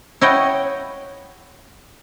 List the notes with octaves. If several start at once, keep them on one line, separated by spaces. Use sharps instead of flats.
E4 C#5 D#5 F#5 G5